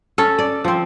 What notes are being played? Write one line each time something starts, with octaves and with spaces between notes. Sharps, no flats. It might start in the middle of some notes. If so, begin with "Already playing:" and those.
C#4 A4
D5
F3 C4